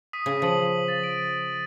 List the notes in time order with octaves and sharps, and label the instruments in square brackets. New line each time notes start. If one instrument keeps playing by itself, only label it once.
[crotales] D#6 B6 D#7
[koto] C#3
[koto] F3 [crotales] D#6 F#7
[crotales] A6
D7